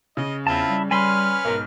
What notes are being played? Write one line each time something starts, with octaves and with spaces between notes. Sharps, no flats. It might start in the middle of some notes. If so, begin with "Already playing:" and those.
C#3 D#5
E2 C4 E4 F4 A5
G3
G3 C#4 B4 G#5 B5 C6 F6
B1 G#2 A#4